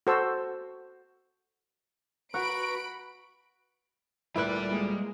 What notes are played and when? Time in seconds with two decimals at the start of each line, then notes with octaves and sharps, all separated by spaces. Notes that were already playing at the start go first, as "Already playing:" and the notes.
0.07 F#4 A4 C5 A5 E6
2.34 F#4 B4 F#5 A#5 B5 C#6 D7
4.36 D2 A#2 G3 E4 B4 E5 G5 F#6
4.69 G#3 A#3